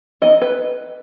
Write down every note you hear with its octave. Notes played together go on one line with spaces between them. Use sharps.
E3 B3 D#4 D#5
B4